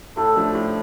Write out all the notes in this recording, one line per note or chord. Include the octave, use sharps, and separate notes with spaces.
A2 A4
F3 A3 D4
A2